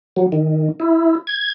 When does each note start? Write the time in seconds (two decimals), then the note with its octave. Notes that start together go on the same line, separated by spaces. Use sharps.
0.16 F#3
0.32 D#3
0.80 E4
1.27 G#6